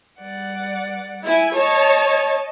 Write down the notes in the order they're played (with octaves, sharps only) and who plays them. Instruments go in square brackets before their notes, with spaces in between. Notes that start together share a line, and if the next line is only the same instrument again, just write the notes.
[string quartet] G3 D5 F#5
[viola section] E4 G#5
[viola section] C#5 A5 [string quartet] D#5